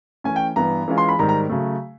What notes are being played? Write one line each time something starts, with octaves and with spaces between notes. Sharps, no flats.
E3 A3 C#4 G#5
G5
G2 E3 G3 B3 A#5
E3 G#3 C#4 F4
C6
B5
G#2 D#3 G3 A#5
A#5
C#3 F#3 A3